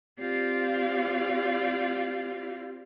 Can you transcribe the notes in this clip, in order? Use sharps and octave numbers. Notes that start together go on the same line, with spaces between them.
C4 F4 G4 D5 F5